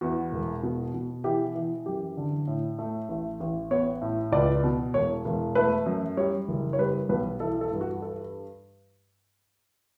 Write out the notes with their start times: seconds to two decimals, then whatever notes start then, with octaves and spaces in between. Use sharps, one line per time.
0.01 E2 F#4
0.32 E1
0.63 B2
0.94 B2
1.24 E3 G4
1.55 E3
1.86 F#2 G4
2.17 D3
2.47 A2
2.79 A3
3.09 A1
3.40 A1
3.71 B3 C#5
4.01 A2
4.32 C#2 D5
4.64 B2
4.94 E1 C#5
5.25 E1
5.55 A3 B4
5.86 F#2
6.17 G3 C#5
6.48 F#1
6.73 C#5
6.79 G3 B4
7.09 B1 B4
7.40 E3 A4
7.61 A4
7.71 G2
7.81 F#4
8.02 A4